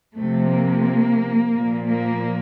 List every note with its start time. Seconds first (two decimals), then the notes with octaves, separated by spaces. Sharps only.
0.18 C3 F3 A3
0.52 A#3
1.54 A#2 F3
1.88 A#3